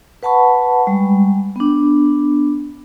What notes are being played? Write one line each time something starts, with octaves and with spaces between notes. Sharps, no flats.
B4 F#5 A5 B5 C#6
G3 G#3
B3 D4